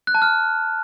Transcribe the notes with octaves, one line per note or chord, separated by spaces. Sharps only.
F#6
A5
F6